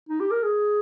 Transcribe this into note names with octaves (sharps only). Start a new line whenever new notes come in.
D#4
G4
A#4
G#4